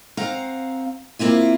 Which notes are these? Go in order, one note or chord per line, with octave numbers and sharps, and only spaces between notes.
C4 F5 F#5 A#5
A#3 C4 E4 F4